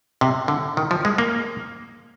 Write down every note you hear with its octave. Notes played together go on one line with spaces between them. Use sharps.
C3
D3
D#3
F3
G#3
A#3